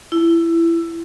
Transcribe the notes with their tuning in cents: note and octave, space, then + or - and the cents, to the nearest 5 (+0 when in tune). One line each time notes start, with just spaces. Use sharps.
E4 +20